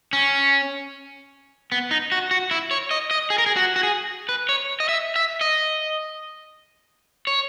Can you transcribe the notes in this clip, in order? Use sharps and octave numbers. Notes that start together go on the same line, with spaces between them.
C#4
B3
D#4
F#4
F#4
E4
C#5
D#5
D#5
G#4
A#4
G#4
F#4
F#4
G#4
B4
C#5
D#5
E5
E5
D#5
C#5